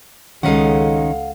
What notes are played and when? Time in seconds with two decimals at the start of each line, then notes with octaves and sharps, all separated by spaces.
0.43 C#2 D#3 G#3 C#4 D#4 A4 F5 F#5